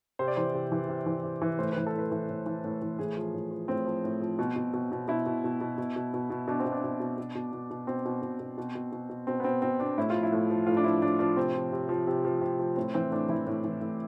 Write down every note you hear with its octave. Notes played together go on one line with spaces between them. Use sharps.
C3 C5
D5
E3 C5
C3
E3
C3
E3
C3
E3
A2 C5
B4
E3
A4
A2 B4
E3
A2
E3
A2
E3
A2 G#4
F3
A2
F3
A2 C4
F3
A2
F3
B2
B2
B2
B2
B2 E4
B2
B2
B2
B2
B2
B2
B2
B2 D4
C4
B2
D4
B2
B2
B2
B2
B2
B2
B2 C4
B2
B2
B2
B2
B2
B2
B2
B2 C4
B3
B2 C4
B2 C4
B2 D4
A2 E4
F4
F3
E4
A2
F3
A2 F4
D4
F3 E4
A2 D4
F3 D4
C3 C4
F3
C3
F3
C3
F3
C3
F3
A2 C4
E3 C4
A2 D4
E3 E4
A2
E3
A2